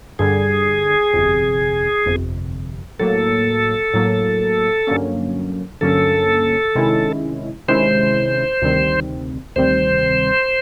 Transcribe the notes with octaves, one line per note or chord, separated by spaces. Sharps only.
G2 D3 G3 G#4
G1 F2 C3
G1 F2 C3
A2 F#3 A#3 A4
A2 F#3 A#3
G2 D3 F#3 A#3 C#4
G2 D3 F#3 A#3 C#4 A4
C3 D#3 G#3 C#4 E4
C3 D#3 G#3 C#4 E4 C5
D2 C3 D#3 G3 C4
D2 C3 D#3 G3 C4 C5